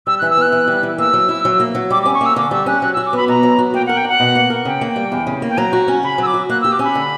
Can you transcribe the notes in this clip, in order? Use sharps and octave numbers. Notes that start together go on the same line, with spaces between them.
G3 E6
F#6
E3
E6
B3 F#6
E3
G3
E3
A#3 E6
F#3
E4
F#3
A#3
F#3
G3 D6
D6
C#4
C#6
A#3 E6
D3 D6
G3 E6
C#4 F#6
F#3 F#6
E6
F#4
D6
B3 B5
B2 A#5
F#3
F#4
A#3 G5
F#5
A#4
G5
D4 F#5
B2
A#3
A#4
C#3 G5
A#3
G5
G3
E2
C#3
A#3
G5
F#3 A#5
F#4
C#4
C#3 B5
F#3 E6
D6
F#4
A#3 F#6
E6
G4
D6
C#4 B5
D3